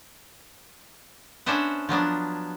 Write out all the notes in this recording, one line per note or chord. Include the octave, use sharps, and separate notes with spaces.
B3 C#4 D4 C5 E5 F#5
F3 F#3 B3 D4